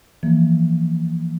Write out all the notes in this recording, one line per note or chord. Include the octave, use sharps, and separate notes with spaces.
E3 F3 A#3